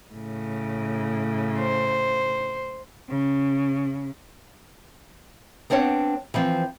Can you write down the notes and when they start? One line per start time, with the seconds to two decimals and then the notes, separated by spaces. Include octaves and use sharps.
0.14 A2 C#3
1.60 C5
3.09 C#3
5.70 B3 C4 D4 C#5 F#5
6.34 E3 F3 C4